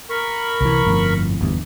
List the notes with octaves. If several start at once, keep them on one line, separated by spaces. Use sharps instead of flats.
A#4 B5 C#6
C2 E3
G1 F2 A2
G1 E2 G2